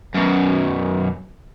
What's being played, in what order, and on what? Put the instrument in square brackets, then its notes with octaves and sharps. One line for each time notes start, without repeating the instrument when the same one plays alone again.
[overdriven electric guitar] F#2 B2